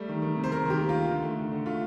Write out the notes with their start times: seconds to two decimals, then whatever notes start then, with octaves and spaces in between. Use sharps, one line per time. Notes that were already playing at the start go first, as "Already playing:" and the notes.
Already playing: G3 A3
0.09 D#3
0.22 D#3
0.36 C3
0.44 C5
0.51 C3 A#4
0.66 D#3 G4
0.81 A#3
0.89 F4
0.95 D#3
1.09 D3
1.23 A3
1.37 D3
1.52 D3
1.66 A3 F4